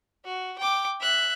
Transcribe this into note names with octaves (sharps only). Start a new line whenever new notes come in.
F#4
G5 D6
E5 F#6